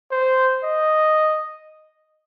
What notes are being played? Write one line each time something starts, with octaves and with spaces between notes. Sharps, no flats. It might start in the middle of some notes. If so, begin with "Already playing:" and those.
C5
D#5